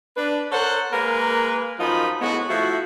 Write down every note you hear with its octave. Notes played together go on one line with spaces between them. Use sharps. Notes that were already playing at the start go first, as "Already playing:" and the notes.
D4 B4
A4 A#4 C5 C#5 F#5
G#3 A#3 A#4 B4
F#2 F3 D#4 F4 B5
A2 C#3 G#3 B3 F#4
F3 A3 E4 F#4